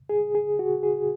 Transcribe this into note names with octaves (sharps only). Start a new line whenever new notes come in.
G#4
G#4
F#4
G#4